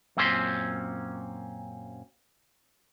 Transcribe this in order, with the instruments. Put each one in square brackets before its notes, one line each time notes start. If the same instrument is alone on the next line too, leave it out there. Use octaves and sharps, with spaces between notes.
[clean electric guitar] F#2 A#2 C4 C#4 C6